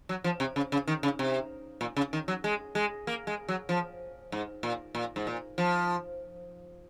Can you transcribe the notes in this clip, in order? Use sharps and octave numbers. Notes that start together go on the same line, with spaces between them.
F#3
F3
C3
C#3
C#3
D#3
C#3
C3
A#2
C#3
D#3
F#3
G#3
G#3
A#3
G#3
F#3
F3
G#2
A#2
A#2
G#2
A#2
F3